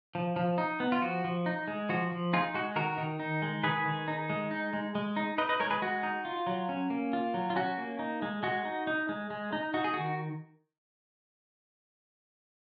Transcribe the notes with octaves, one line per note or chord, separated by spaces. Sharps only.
F3
F3
D#4
B3
F4
F3 F#4
F3
D#4
G#3
F3 F#4
F3
D#4 F4 G#4
G#3 F#4
D#3 F#4 A#4
D#3
D#4
G#3
D#3 G#4 B4
D#3
D#4
G#3
D#4
G#3
G#3
D#4
D#4 B4 D#5
B4 D#5
G#3 A#4 C#5
G#4 B4
G#3 F#4
D#4
F4
F#3
C#4
A#3
F4
F#3
F4
C#4 F#4
A#3
D#4
G#3
G#3 F#4
D#4
D#4
G#3
G#3
D#4
D#4 F#4
G#4
D#3 F#4